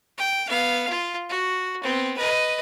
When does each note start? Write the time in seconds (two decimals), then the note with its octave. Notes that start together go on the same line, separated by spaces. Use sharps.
0.18 G5
0.48 B3 F5
0.89 F4
1.30 F#4
1.83 B3 C4
2.18 B4 D#5